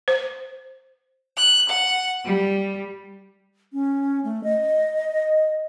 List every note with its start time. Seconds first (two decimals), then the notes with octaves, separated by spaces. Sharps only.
0.08 C5
1.38 F#6
1.69 F#5
2.25 G3
3.73 C#4
4.24 A3
4.44 D#5